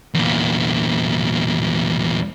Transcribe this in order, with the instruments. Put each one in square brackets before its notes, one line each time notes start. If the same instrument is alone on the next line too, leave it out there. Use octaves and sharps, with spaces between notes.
[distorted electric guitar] E2 A#2